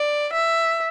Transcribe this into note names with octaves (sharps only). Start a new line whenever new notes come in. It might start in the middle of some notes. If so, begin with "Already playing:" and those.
Already playing: D5
E5